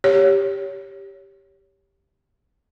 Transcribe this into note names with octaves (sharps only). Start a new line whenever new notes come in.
G4 C#5